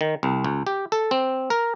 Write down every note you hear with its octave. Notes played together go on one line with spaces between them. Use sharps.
D#3
C2
C#2
G4
A4
C4
A#4